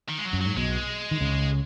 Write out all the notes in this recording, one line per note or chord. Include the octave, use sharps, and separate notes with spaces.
D#3
G#3
F#3
F#2
G#2 F#3
B1 B2 G#3
D#3
C#2 C#3